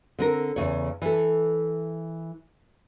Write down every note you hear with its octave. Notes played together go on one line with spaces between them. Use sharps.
D3 C4 A#4
E2 C#3 C#5
E3 A4